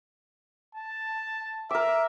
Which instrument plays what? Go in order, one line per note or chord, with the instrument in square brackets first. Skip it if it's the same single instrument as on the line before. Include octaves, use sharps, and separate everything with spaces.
[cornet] A5
[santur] A#4 D6 [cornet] E5